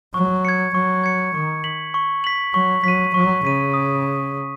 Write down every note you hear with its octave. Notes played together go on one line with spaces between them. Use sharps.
F#3 C#6
G#6 C#7
F#3 C#6
G#6 C#7
D#3 C#6
B6 F#7
C#6
B6 F#7
F#3 C#6
F#3 B6 D#7
F#3 C#6
C#3 B6 D#7
D#6